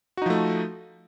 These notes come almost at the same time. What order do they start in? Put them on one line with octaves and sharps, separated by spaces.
F#4 D#4 F3 A3